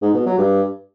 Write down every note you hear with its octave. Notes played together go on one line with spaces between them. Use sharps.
G#2
B2
F#3
G2